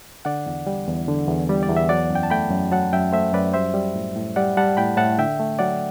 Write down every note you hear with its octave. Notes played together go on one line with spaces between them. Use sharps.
D3 D5 F#5
E2
G3
E2
D3
E2
G3
D5
E2
E5
F#3 D5 F#5
F#2
G5
A5
A3 G5 B5
F#2
F#3 F#5 A5
F#2 E5 G5
A3 C5 E5
F#2 B4 D5
G3 C5 E5
G3
A2
A2
G3 D5 F#5
G3 F#5 A5
A2 G5 B5
A2 F#5 A5
D3 E5 G5
A3
F#3 D5 F#5